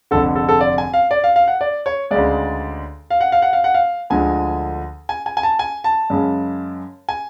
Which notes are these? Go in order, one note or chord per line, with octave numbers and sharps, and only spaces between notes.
F1 F2 D3 A4
A4
A4
D5
G#5
F5
D5
F5
F5
F#5
D5
C#5
D2 C#3 G#3 D5
F5
F#5
F5
F#5
F5
F#5
F5
D2 D3 F3 G#3 G#5
G#5
G#5
G#5
A5
G#5
A5
F#2 C#3 G#3
G#5